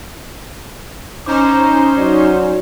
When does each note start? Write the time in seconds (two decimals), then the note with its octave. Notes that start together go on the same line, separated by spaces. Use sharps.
1.26 C#4 D#4 C5 A#5 D6
1.98 F#3 D5